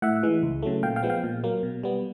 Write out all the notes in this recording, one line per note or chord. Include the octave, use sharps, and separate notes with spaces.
A2 E5 F#5
E3 G#3
C#2
C#3 F#3 A3
A#2 F5 G5
F5 G5
F3 G#3 B3
F5 G5
A#2
F#3 A#3
B2
G3 B3